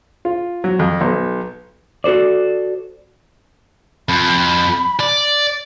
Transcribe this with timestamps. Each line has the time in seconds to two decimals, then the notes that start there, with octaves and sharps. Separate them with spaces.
0.25 F4
0.64 F#3
0.79 F2
1.01 B1
2.04 F#4 A4 C5 D5
4.09 F2 B5
5.00 D5